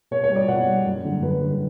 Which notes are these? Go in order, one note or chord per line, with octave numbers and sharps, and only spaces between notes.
B2 C#5
C#5
G3
D5
B2 F#5
G3
F#2
D3 G3
F#2 B4
D3 G3